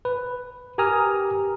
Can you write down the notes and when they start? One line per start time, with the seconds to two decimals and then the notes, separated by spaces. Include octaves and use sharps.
0.05 B4
0.78 G4 A#4 G#5 A#5 D#6 F6